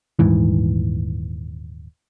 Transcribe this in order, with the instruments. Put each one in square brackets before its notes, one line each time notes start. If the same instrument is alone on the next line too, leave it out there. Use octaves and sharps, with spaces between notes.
[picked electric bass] D#1 G#2 E3